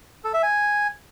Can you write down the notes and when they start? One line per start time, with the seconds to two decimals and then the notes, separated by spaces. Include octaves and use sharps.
0.24 A4
0.34 E5
0.43 G#5